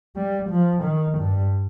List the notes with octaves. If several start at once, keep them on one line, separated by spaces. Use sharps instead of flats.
G3
F3
D#3
G2